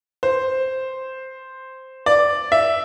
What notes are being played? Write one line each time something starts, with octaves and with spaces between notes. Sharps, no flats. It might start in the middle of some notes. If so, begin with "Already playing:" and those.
C5
D5
E5